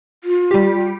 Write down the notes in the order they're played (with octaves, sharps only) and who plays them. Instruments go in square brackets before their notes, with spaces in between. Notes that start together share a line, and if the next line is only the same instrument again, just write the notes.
[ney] F4
[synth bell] G3 G4